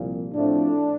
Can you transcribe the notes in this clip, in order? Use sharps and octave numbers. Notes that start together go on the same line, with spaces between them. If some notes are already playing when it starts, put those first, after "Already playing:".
Already playing: C2 A#2 F3
A2 F3 A3 C4 D4